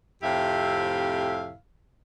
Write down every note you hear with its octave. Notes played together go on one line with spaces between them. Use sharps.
F2 A2 C3 E4 G4 F5